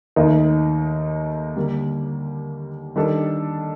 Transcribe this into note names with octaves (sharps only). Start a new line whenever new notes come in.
D#2 D#3 A3 D#4
D3 G3 A#3
D#3 G3 D4 A4